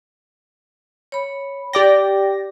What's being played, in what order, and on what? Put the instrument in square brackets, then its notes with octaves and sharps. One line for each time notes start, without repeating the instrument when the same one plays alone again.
[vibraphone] C#5 B5
[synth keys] G4 D5 A#6 [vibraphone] G5